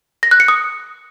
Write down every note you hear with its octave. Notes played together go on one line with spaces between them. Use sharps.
A#6
F#6
C#7
D#6